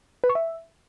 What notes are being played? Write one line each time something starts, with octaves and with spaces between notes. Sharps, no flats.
B4
C#6
E5